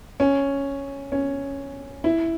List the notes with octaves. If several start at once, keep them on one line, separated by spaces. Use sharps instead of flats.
C#4
C#4
E4